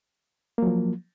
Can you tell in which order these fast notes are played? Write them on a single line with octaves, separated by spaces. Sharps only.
A#3 F#3 F3